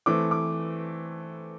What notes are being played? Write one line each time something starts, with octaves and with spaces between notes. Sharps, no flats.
E3 A3 C4 D6
D6